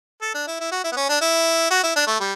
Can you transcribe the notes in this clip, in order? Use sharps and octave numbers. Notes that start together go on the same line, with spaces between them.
A4
D4
E4
E4
F#4
E4
B3
C#4
D4
E4
F#4
E4
D4
A3
G3